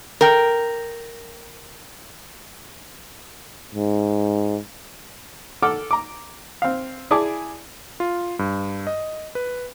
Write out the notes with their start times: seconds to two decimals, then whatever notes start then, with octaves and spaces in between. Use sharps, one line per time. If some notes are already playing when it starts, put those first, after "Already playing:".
0.21 A#4 G5
3.75 G#2
5.62 A4 F#5 D6 F6
5.91 A#5 D6
6.62 C4 F5
7.11 E4 G#4 D5 G#5 A5 D6
8.00 F4
8.39 G2
8.87 D#5
9.35 B4